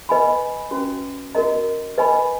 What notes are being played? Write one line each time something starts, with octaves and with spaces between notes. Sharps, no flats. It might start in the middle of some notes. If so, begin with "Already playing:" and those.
B4 D#5 G#5 B5
C#4 F#4 B4
F#4 A#4 D#5 A#5
B4 D#5 G#5 B5